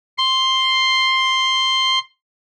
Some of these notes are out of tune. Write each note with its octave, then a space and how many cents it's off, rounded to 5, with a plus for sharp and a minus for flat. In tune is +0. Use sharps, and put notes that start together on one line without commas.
C6 +5